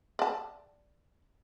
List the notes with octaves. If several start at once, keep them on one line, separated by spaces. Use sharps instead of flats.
D5 A5